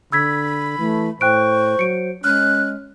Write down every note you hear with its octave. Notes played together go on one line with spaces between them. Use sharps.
D3 B5 E6 G#6 B6
E3 A3
A2 C5 G5 C#6 F#6 D7
F#3 C#7 D7
G#3 C#4 F6 F#6